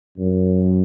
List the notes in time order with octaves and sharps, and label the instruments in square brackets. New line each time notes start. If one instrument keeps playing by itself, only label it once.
[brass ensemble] F#2